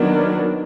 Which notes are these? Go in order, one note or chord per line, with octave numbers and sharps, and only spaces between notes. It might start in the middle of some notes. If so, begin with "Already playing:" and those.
Already playing: D#3 F#3 B3 D4